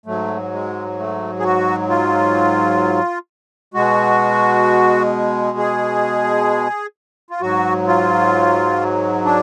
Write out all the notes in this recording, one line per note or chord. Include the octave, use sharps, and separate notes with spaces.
G#2 F#3 A3
G#3
A3
G#4
F#4
F4
B2 G#3 F#4
G#4
F4
G#2 F#3 F#4
F4
D4